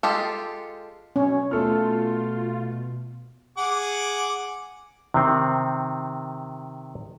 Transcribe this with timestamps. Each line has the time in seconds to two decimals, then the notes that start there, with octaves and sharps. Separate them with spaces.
0.03 G#3 F4 G4 A4
1.16 B2 C#4 C#5
1.51 B2 A3 F4 A4 F6
3.58 G#4 F#5 D6
5.14 C3 D#3 C4